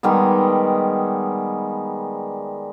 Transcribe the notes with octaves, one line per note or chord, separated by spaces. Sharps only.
D#3 G3 G#3 B3